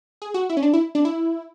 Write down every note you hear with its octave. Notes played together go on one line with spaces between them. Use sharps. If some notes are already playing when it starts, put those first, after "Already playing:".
G#4
F#4
E4
C#4
D4
E4
D4
E4